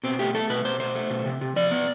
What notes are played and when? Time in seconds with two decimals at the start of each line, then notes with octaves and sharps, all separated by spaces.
0.04 B2 C4
0.19 A3 G4
0.34 A3 A4
0.50 B2 B4
0.65 B2 C5
0.80 A3 C5
0.95 A3
1.10 B2
1.26 C3
1.41 C3
1.56 F3 D5
1.71 B3